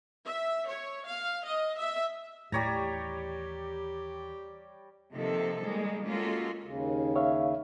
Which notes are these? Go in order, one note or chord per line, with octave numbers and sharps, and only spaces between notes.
E5
C#5
F5
D#5
E5
D#2 A2 E3 G3 G4 C#5 A#5
C3 D#3 F3 A#3 A4
D#3 G3 G#3 A#3
G#3 A#3 C#4 F4 F#4 A4
D#2 C#3
C#5 E5 F5